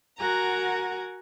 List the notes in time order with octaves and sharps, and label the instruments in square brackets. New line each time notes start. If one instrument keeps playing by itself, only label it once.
[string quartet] F#4 A#4 F#5 G#5 A#5